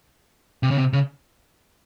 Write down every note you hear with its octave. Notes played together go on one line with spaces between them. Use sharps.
C3
C#3
C3
C#3